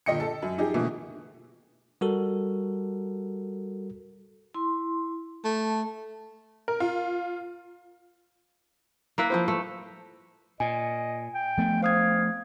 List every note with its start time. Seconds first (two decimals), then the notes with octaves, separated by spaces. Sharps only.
0.06 G1 A#2 D#5 G5 C#7
0.20 A4
0.42 F#2
0.58 F3 D#4 G4 G#4
0.74 B2 D3 E3 F3 A3 A#3
2.01 G3 F#4 A4 A#4
4.54 E4 C6
5.44 A3 A5
6.68 A#4
6.80 F4
9.18 A#3 E4 B4
9.30 F3 F4 C5
9.48 A3
10.60 A#2 D#5 G#5
11.34 G5
11.57 F3 A3 B3
11.83 C5 F5 D#6 G#6